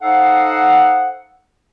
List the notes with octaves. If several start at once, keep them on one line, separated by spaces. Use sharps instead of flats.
D#4 A4 C5 F5 F#5